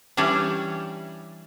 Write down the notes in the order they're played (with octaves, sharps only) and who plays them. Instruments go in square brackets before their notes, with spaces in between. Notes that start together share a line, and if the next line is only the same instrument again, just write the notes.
[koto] E3 G3 C#4 D4